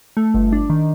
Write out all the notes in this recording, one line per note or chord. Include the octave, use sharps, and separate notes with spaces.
A3
G1
D4
D#3